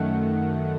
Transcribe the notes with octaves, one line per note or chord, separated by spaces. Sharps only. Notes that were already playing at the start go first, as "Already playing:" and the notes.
Already playing: F#2 D#3 A3 F#5